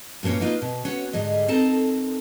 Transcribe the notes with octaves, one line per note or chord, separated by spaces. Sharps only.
G2 A#2 A#3 C#4 C#5
A#3 D#4 F4 B4 F5
B2
C#4 F#4 C#5
D2 G#2 G3 G#4 D#5
C4 D#4 A4 A#4 A5 A#5